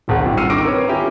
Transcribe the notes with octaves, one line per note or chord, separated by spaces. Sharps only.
D1 G#1 G#4 F#5
D#3 G3 C4 F4
E6 F6 C7 C#7 D#7
D#3 C#6 D6 A#6 D7
C4 A#4 B4 C#5
C#4 E4 F4 G4